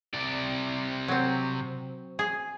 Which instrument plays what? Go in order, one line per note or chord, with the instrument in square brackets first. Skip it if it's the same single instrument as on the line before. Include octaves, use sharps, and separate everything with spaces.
[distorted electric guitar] C3 D5
[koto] F#3 C4
G#4